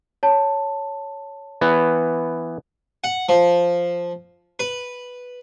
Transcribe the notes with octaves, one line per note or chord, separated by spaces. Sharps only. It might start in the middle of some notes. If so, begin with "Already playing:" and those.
C#5 A5
E3 B3
F#5
F3
B4